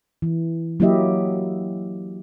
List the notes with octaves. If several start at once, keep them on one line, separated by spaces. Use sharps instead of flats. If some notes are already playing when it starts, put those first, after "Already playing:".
E3
F#3 A#3 E4 G4 D#5 E5